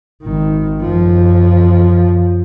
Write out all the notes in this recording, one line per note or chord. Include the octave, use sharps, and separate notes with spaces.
G#1 D#3
F#2 F3